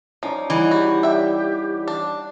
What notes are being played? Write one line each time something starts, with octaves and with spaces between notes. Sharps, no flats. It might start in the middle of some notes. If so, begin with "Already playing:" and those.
F3 C#4 D#4 D5
E3 G3 G#3 D#4 F#5
F#4 G4
E5 G5
D4 F5